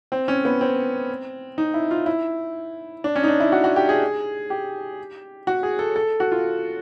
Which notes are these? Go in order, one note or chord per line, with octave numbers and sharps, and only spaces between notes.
C4
C#4
B3
C4
D#4
E4
F4
E4
D4
C#4
D#4
D4
E4
F#4
F#4
G4
G#4
G4
F#4
G#4
A4
A4
F#4
F4